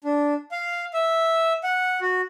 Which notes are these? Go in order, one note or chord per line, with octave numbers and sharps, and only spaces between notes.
D4
F5
E5
F#5
F#4